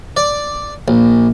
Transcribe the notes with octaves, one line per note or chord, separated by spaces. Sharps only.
D5
A#1